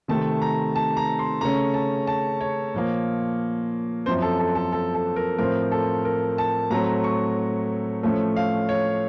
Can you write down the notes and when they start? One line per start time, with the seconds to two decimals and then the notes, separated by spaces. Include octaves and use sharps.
0.08 C3 D#3 A3 C4 A5
0.42 A#5
0.76 A5
0.97 A#5
1.19 C6
1.41 C#3 A3 C#4 A#5
1.74 A5
2.07 A5
2.41 C#5
2.74 A#2 F3 A#3
4.06 F#2 F3 C4 C5
4.22 A4
4.39 A4
4.55 A4
4.72 A4
4.94 A4
5.16 A#4
5.38 A2 F3 C4 A#4
5.71 A4
6.05 A#4
6.38 A5
6.71 A2 F#3 A3 C4 A#5
7.04 C#6
8.03 A2 F3 A3 C#4
8.36 F5
8.69 C#5